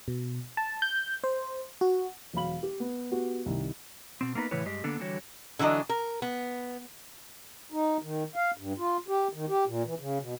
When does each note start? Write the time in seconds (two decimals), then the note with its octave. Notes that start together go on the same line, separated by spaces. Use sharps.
0.08 B2
0.57 A5
0.82 G6
1.24 C5
1.81 F#4
2.33 E1 F#3 F5 B5 F#7
2.63 G4
2.80 B3
3.11 B3 F#4 G4
3.46 C2 D#3
4.21 B2 C4
4.35 A#3 B3 D#4 B4
4.51 A2 C#3 E3 E4 B4 C#5
4.65 G2 G#3 G4 D#5
4.84 D3 A#3 B3 D4 A4
5.00 D3 E3 G3 F#4 C#5
5.59 D3 E3 F#3 D4 D#5
5.89 A#4
6.22 B3
7.72 D#4
8.02 D#3
8.36 F5
8.58 G2
8.78 F4
9.08 G4
9.33 D#3
9.49 G4
9.67 A#2
9.85 E3
10.00 C#3
10.20 B2